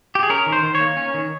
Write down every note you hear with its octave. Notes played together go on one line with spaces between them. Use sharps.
G4
G#4
C#4 A#4
D#3
C5
D#3
C#5
A#3
C#4
D#3